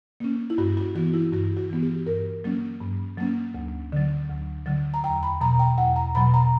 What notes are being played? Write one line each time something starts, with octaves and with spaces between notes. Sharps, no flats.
A#3 C#4
E4
G2 F#4
F#4
E3 B3 F#4
E4
G2 F#4
F#4
E3 B3
G4
G2 A#4
F#3 A#3 C#4
G2
F#3 A#3 C#4
D2
D3 F#3
D2
D3 F#3
A#5
E2 G5
B5
B2 F#3 A#5
G5
E2 F#5
A#5
B2 F#3 B5
A#5